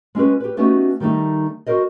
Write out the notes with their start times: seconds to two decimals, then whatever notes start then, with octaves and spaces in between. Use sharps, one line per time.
0.15 G#3 C#4 F4 G4 B4
0.40 G4 B4
0.57 A3 B3 C#4 D#4 F#4 G4
1.00 D#3 G3 A3 D#4
1.66 F#4 A#4 C5 D#5